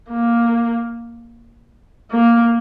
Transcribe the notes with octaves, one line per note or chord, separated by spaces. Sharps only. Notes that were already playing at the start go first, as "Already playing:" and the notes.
A#3
A#3